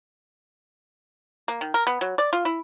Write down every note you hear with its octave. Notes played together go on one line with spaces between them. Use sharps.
A#3
D#3
A#4
B3
F#3
D5
F4
E4